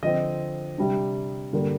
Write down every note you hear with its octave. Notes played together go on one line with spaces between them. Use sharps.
D3 F3 C4 D#5
C3 G3 D4
G2 D3 G3 A#3